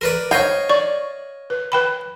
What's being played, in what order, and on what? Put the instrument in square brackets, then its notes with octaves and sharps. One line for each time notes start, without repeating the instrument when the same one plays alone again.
[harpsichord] A#4 B4 D5
[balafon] C5 [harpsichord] C#5 D#5 F5 [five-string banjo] G5
[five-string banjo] D5 [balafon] C#6
[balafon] B4
B4 G5 B5